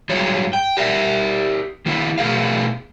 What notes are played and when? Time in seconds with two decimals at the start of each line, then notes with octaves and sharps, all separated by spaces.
0.09 G2 F#3 G#3 G#4 C#5
0.53 G5
0.77 G4 A#4 D5 E5
1.86 D#3 A#3 E4
2.18 B2 A3 G#4 A#4 F5